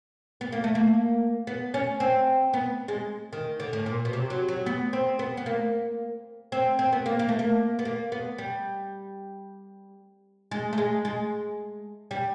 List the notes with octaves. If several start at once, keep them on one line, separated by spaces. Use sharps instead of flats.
B3
A#3
A3
A#3
B3
C#4
C4
B3
G#3
D#3
D3
A2
A#2
B2
C3
F#3
F#3
B3
C4
B3
B3
A#3
C4
C4
B3
A#3
A#3
A3
A#3
B3
A#3
B3
G3
G#3
A3
G#3
G#3
G3